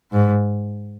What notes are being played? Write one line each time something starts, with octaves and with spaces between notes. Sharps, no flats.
G#2